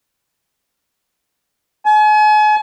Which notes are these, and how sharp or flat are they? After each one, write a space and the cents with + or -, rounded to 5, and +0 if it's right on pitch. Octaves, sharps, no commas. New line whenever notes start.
G#5 +40